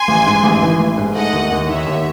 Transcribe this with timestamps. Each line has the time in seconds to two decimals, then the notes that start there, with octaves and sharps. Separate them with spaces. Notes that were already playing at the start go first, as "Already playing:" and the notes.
Already playing: G#5 C6
0.08 A1
0.26 G#2
0.43 A1
0.62 E3
0.80 A1
0.98 G#2
1.15 A3 D#5 F#5
1.33 D#2
1.51 D#2
1.69 D#3 C#5 E5
1.86 D#2